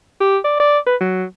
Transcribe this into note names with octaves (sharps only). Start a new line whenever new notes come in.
G4
D5
D5
B4
F#3